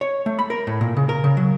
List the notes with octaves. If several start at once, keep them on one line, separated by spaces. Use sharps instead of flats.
C#5
A3
B5
A#4
A2
A#2
C#3
A#4
C#3
F#3